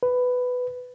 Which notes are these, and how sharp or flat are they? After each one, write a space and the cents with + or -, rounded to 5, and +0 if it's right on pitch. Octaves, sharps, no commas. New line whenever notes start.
B4 +10